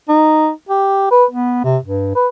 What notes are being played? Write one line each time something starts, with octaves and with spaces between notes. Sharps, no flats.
D#4
G4
B4
B3
C3
G2
B4